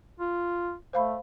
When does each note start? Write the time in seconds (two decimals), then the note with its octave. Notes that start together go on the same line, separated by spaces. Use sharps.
0.20 F4
0.93 A3 C5 F5 B5